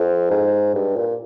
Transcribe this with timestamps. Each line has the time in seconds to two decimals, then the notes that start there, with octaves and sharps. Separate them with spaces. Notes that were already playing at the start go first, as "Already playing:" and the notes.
Already playing: F2
0.31 G#2
0.74 G2
0.96 A#2